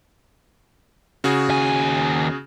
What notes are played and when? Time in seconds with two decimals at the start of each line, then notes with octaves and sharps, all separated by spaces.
1.24 C#3 F#4 G#4
1.49 D#2 G#5